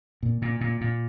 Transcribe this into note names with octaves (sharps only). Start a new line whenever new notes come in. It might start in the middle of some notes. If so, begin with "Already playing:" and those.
A#2
A#2
A#2
A#2